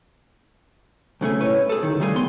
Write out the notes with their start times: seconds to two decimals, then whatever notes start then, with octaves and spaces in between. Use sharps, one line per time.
1.21 B1 C#3 A3 G#4
1.40 A2 E4 B4 C#5
1.69 G#4 A4
1.83 C#2 A2 D#3
2.00 G3 A3 F4 G#4
2.15 D#3 B3 C6